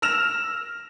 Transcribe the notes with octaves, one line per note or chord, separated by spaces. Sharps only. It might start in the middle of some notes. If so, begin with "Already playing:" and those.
E6 F6 A#6 E7 F7